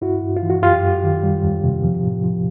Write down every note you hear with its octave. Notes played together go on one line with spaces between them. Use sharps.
G2 E4 F#4
G2
F4
E3
F#4
F#2 F4 G4
F#2
D#3
G3
E2
C3
F3
A2
F3